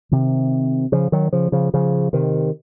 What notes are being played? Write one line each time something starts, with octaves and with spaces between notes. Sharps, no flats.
C3 D#3
C#3 F3
D#3 F#3
C#3 F3
C#3 F3
C#3 F3
C3 D#3